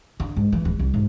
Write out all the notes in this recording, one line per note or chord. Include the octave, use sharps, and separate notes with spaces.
D3
G#2
E3
D1
C2
G#2